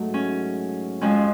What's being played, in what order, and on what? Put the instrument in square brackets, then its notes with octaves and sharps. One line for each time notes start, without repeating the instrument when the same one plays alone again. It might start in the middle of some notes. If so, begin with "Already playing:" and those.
Already playing: [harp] G#2 F#3 A3
C#4
F2 F3 G#3 C#4